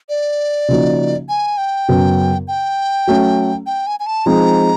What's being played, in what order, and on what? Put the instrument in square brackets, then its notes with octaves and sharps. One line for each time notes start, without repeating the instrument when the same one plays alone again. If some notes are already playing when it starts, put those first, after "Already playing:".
[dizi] D5
[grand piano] C#3 F3 A#3 D#4 F#4
[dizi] G#5
G5
[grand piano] F#2 C#3 F#3 B3
[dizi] G5
[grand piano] F#3 A3 C#4
[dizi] G5
G#5
G#5
A5
[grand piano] F3 G#3 C4 D#4 G#4 [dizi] A#5